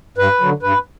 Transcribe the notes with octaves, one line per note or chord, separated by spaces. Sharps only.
G2 B4
D3 F#3
G2 B4